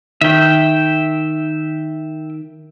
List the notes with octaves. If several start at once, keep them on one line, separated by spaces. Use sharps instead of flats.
D#3 E5 G5